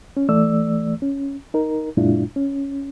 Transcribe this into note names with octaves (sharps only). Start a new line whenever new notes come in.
C#4
E3 A3 D5 E6
C#4
D#4 A#4
F#2 A#2 G#3 D4 E4 F4
C#4